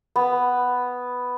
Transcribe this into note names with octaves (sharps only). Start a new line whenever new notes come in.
B3